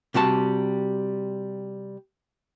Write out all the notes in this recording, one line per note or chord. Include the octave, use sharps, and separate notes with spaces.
C3 G3 F#4 A5